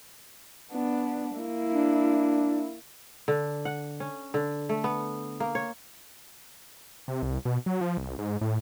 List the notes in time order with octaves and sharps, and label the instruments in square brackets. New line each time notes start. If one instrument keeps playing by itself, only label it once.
[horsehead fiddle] B3 D4
A#3 E4
[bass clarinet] D4
[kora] D3
F#5
C#4
D3
A3
B3
A#3
C#5
[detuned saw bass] C3
C2
B2
F#3
F3
C2
G#2
A2